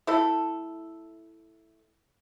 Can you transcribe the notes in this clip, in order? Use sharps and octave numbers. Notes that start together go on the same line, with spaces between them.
A3 E4 A4